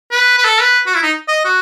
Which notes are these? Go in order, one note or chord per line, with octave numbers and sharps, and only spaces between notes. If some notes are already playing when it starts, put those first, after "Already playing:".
B4
B4
A4
B4
F#4
E4
D#4
D#5
F#4